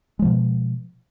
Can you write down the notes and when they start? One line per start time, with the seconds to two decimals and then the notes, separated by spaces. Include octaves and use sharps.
0.19 G#3
0.22 F3
0.25 B2